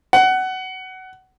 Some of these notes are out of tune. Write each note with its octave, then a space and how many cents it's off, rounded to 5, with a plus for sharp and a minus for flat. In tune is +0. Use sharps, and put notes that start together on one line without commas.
F#5 +20